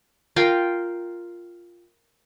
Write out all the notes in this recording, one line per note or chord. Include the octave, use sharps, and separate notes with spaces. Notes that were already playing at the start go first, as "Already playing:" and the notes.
F4 A#4 F5 G5